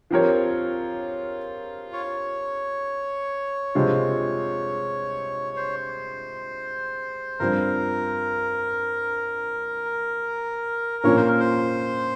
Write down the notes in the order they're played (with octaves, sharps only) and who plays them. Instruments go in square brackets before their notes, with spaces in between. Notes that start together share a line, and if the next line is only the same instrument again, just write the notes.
[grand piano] F3 C4 G4 A#4 C#5 [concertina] F4
[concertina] C#5
[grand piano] C3 F3 G#3 C4 F4
[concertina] C5
[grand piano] G2 F3 C4 [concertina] A#4
[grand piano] A#2 F3 A#3 C#4 [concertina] C#5
[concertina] C5
A#4
C5